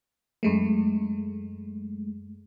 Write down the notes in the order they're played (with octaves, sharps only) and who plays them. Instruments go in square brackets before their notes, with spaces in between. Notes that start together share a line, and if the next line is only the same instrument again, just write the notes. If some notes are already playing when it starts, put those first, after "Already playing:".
[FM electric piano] F#2 G#3 A3